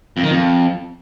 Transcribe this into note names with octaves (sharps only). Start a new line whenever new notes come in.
F2
D#3
F2